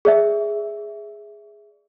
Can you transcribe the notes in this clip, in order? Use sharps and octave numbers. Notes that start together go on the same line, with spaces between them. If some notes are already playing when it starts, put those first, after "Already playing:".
G#4 D5 E5